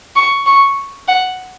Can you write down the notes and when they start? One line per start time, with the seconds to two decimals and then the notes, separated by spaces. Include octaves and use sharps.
0.16 C#6
0.46 C#6
1.08 F#5